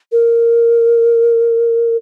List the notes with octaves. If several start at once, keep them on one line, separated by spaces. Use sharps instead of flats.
A#4